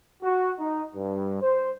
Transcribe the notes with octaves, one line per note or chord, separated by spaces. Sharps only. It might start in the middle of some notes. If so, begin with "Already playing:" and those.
F#4
D#4
G2
C5